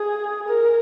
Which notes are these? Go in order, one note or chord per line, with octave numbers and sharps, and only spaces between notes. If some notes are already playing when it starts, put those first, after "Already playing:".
Already playing: G#4
A#4